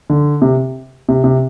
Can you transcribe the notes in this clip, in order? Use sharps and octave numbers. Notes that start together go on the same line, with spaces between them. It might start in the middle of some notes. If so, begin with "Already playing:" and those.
D3
C3
C3
C3